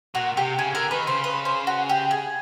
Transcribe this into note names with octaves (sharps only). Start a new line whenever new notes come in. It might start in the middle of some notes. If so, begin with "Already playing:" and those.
A#2 F#4
C3 G4
C#3 G#4
D3 A#4
D#3 B4
C#3 C5
B4
C5
F#4
G4
G#4